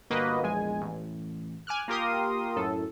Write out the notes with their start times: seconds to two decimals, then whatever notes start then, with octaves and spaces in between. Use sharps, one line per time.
0.10 G1 A#3 F#4 B4 D#5
0.42 A#1 E2 G#3 G#5
0.81 A1
1.67 G#5 D6 F6 F#6
1.88 A#3 F4 G4 A#4 C6 D#6
2.56 F#2 A2 A4